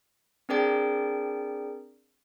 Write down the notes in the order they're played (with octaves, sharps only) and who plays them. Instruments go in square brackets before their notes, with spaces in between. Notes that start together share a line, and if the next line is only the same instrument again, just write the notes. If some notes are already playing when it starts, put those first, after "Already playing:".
[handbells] C4 D4 G#4 A#4 D5 G5